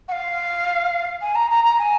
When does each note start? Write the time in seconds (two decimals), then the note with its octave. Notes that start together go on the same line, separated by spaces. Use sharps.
0.08 F#5
0.12 F5
1.22 G#5
1.35 A#5
1.50 A#5
1.64 A#5
1.78 G#5